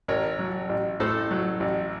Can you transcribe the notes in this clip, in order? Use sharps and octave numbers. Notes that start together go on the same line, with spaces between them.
A1 A#4 C#5
F#3
A1
A2 A4 C5
F#3
A1